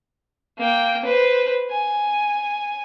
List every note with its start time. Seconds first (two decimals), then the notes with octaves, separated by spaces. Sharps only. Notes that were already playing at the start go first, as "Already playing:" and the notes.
0.58 A#3 G5
1.05 B4 C5
1.71 G#5